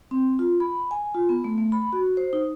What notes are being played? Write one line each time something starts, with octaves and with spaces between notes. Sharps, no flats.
C4
F4
B5
G#5
F4
B3
A3
A3
B5
F#4
C5
D#4